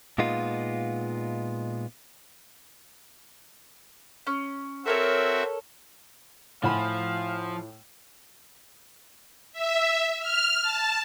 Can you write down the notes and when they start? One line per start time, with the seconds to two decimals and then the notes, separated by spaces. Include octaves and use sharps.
0.18 A#2 G#3 B3 D#4 F4
4.27 C#4
4.86 C4 F#4 A4 A#4 C#5 E5
6.63 A2 F3 E4 F5 F#5 G#5 B5
9.53 E5
10.20 F6
10.62 A5